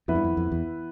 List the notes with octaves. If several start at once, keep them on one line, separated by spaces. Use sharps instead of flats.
F2 E3 B3 E4 B4 E5
G2
F2
F2
E2